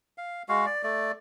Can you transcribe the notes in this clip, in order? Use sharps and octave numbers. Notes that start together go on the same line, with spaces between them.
F5
G#3 F#4 F5
D5
A3 D5